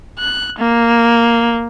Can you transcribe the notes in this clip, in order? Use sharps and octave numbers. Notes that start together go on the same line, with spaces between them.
F#6
A#3